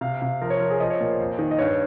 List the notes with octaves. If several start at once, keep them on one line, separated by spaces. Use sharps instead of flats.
C3 F5
C3 F5
F3 A#4
C#5
F3 A#4
G#4
F3 D#5
C#5
A#2 A#4
C5
F2
D#3
D#5
G2 C#5